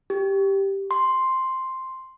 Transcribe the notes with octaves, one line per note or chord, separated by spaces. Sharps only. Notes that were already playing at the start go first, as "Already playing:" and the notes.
G4
C6